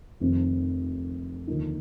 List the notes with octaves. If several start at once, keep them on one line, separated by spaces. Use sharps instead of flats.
F1 F2 C3 D#3
D#2 D3 F3 A#3 D#4